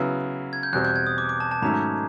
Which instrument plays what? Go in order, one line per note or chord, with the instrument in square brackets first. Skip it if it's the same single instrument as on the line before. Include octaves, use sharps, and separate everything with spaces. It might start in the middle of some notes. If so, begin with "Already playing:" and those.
Already playing: [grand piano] C#3 F#3 B3 E4
[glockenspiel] G#6
G6
[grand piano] E2 B2 G3 C4 [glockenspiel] F#6
[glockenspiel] G6
G#6
D#6
D6
D6
A5
A5
[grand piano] G#2 D#3 F#3 A3 C#4 [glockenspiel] A#5